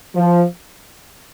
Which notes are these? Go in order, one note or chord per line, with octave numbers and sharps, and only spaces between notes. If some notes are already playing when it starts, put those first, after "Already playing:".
F3